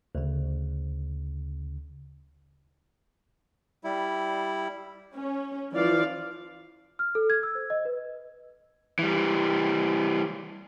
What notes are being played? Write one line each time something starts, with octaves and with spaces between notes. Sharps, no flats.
D2 C#3
G3 E4
C#4
E3 F3 D5 F5
F6
A4
G#6
E6
C5
D#5
B4
E3 G3